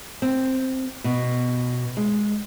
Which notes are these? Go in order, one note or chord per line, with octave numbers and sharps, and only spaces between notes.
C4
B2
G#3